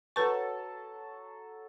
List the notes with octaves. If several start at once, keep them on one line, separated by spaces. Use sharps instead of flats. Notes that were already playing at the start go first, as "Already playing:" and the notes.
F#3 A4 B4 A5 C#6